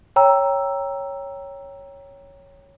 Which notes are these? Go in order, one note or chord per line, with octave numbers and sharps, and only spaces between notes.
C#5 G5 A#5 E6